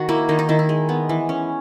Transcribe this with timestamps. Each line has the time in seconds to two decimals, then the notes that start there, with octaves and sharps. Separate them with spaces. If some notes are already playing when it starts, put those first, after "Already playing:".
Already playing: D#3 F#4
0.09 A#3 E4
0.29 D#3 D#4
0.39 D#4
0.49 D#3 E4
0.59 E4
0.69 G#3
0.89 B3
1.09 E3
1.29 C#4